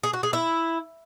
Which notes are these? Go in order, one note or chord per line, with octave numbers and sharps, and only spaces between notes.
G#4
F#4
G#4
E4